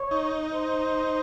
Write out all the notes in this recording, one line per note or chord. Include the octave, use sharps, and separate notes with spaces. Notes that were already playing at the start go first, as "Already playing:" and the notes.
Already playing: C#5
D#4
C5